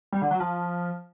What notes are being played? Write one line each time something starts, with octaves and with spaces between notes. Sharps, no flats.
G3
D3
F#3
F3